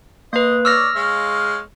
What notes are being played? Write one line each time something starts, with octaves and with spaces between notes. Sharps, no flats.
A#3 B4 D#5
C#5 D5 E6 F6 A#6
G#3 C#5 F5